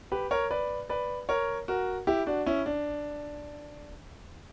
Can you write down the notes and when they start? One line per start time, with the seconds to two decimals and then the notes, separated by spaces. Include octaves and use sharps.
0.12 G4 B4
0.31 A#4 C#5
0.51 B4 D5
0.89 B4 D5
1.29 A#4 C#5
1.68 F#4 A#4
2.07 E4 G4
2.27 D4 F#4
2.46 C#4 E4
2.66 D4